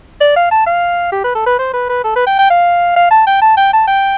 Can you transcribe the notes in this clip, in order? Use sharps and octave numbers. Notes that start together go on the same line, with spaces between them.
D5
F5
A5
F5
G4
B4
A4
B4
C5
B4
B4
A4
B4
G5
G5
F5
F5
A5
G5
A5
G5
A5
G5